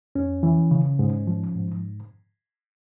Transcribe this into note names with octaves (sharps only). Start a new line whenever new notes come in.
F2 C#4
E3
C#3
G#2
F3
G#2